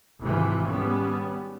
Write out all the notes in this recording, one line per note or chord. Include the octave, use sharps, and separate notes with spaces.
G#1 C3 E3 F3
G#1 G3 B3 C#4